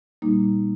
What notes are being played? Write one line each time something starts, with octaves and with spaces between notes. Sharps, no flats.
A#2 G3 A#3 D#4